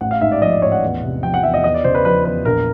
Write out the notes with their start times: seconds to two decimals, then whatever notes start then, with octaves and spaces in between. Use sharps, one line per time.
0.01 A1 F#5
0.11 F5
0.21 G#2 E5
0.32 D5
0.42 F3 D#5
0.52 D5
0.62 A1 C#5
0.72 F#5
0.82 E2
1.03 C3
1.23 F3 G5
1.34 F#5
1.43 E2 E5
1.54 D#5
1.64 E2 D#5
1.74 D5
1.84 C#3 C5
1.95 B4
2.05 F3 B4
2.25 E2 B4
2.45 A#1 A#4